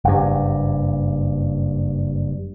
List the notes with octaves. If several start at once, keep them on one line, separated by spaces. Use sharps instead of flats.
F#1 G2